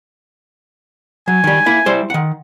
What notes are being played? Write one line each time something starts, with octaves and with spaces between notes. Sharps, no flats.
F#3 G#5
D#3 G3
A#3 E4
G3 E4 C5
D#3 F#5